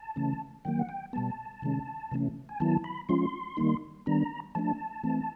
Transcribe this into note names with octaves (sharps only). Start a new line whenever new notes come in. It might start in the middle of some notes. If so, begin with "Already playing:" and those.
Already playing: A5
C#3 E3 A3 C#4
D#3 F#3 A#3 G5
F#5
G5
B2 G3 B3 A5
C3 D#3 G#3 C#4
C3 E3 A3 C#4
G#5
D#3 F#3 B3 E4 A5
B5
F3 G#3 C#4 F4 C6
D#3 G3 A#3 D#4
D#3 G3 B3 D4 A#5
F3 A3 D4 A5
E3 A3 C4